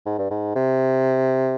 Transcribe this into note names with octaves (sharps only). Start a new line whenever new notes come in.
G#2
G2
G#2
C3